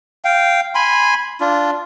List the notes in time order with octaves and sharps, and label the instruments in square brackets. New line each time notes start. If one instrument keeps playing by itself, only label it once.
[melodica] F5 G5
G#5 B5 C6
D4 F4